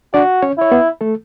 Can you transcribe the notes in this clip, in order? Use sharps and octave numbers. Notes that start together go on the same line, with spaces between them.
D4 F#4 D5
C#4 C#5
E4 C#5
B3 B4
A3 A4